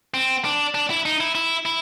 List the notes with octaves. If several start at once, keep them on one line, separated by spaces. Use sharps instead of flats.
C4
D4
D4
E4
D#4
E4
E4
E4